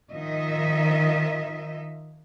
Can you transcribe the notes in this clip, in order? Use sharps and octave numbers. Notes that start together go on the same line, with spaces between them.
D#3 F3 D#5 E5